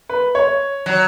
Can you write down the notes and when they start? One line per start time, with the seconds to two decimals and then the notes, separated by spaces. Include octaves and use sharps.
0.09 B4
0.35 C#5
0.86 F#3